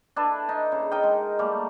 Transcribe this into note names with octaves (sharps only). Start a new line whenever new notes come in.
D4 E4 A4 B4
D#4
C#3
D#4 A#4 D#5 G5
G#3
G3 A3 A#3